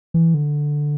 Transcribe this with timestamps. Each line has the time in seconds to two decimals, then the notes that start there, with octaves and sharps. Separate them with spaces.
0.14 E3
0.34 D3